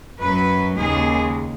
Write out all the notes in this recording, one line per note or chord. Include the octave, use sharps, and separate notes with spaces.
F#2 F#3 B4
D#2 C#3 G#3 G#4